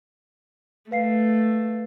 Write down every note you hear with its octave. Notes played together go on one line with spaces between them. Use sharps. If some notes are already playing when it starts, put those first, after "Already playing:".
A3 B4 F5 C7